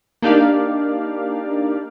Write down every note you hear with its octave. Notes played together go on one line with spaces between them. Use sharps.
A#3 D4 D#4 G4 D5 F5